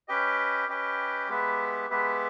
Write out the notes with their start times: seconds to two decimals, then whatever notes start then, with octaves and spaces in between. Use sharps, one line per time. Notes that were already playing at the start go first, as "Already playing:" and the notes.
0.08 C#4 G4 B4 D#5 G5
0.69 C#4 G4 B4 D#5 G5
1.29 G#3 B3 G4 B4 E5
1.90 G#3 B3 G4 B4 E5